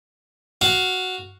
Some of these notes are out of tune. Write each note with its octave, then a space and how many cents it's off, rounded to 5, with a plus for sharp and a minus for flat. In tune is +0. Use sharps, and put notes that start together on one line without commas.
F#4 +0 F5 +0